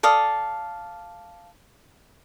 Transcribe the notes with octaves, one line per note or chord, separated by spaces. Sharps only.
A4 D5 F5 D#6